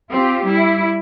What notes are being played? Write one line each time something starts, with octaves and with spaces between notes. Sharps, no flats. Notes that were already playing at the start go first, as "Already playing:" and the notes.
C4 F4 G4
G3 E4